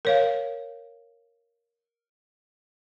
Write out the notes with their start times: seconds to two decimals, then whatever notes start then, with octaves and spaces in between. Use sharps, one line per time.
0.05 A#4 C#5 F5